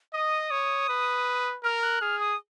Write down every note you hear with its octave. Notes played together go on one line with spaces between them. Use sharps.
D#5 D#6
C#5
B4
A#4 F6
F#6
G#4 F6
D#6